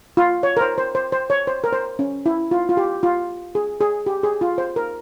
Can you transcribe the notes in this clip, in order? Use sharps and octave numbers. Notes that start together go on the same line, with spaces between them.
F4
C#5
A#4
C5
C5
C5
C5
C#5
C5
A#4
C5
C#4
E4
F4
F4
G4
F4
G#4
G#4
G4
G#4
F4
C5
A#4